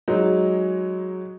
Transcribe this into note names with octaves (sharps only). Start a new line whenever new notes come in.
F#3 G#3 D#4